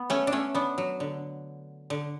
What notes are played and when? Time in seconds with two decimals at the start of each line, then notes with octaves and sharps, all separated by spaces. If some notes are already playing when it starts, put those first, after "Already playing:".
Already playing: B3
0.10 A3 C#4
0.27 D4
0.32 A3 C#4
0.55 B3 D4
0.78 F#3
1.00 D3
1.90 D3